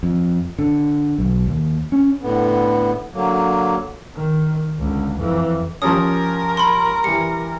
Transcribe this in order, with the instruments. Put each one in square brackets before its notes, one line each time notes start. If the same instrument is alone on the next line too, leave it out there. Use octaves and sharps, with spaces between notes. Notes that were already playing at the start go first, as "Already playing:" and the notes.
[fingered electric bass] F2
D3
B1
D#2
C#4
[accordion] A2 D3 B3
D3 F#3 A#3
[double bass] D#3
C#2 D3
F2 E3
[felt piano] F3 G3 C#4 [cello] A#4 [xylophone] D#6
[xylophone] B5 C6
[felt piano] E3 G3 [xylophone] C#7